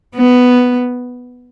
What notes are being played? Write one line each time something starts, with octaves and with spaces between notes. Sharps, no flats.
B3